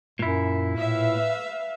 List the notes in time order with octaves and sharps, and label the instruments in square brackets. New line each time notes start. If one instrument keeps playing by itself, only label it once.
[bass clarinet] F#2 [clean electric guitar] A#2 E4
[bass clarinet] A2 [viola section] B4 E5 F5